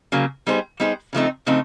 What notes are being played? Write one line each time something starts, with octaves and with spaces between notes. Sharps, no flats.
C#3 F#3 A#3
G3 B3 D#4 G#4 C5
G3 B3 D#4 G#4 C5
C#3 F3 A3 C4 D#4
C#3 F3 A3 C4 D#4